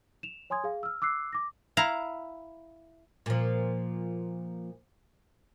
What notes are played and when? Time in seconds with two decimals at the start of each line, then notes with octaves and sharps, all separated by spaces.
0.23 E7 F7
0.50 C#5 G#5 C6 D#6 G#6
0.64 G#4 F5
0.83 E6 F6
1.02 D6 E6 F#6 C7
1.33 D6 A#6
1.77 E4 F5 A#5
3.26 A#2 F3